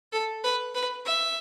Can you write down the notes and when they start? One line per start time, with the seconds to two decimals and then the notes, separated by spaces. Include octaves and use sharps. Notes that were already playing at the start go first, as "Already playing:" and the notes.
0.12 A4
0.44 B4
0.75 B4
1.06 E5